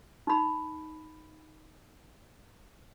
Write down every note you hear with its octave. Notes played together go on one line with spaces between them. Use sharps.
D#4 B5